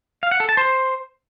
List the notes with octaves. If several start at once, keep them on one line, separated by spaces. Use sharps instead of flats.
F5
F#5
A4
A5
C5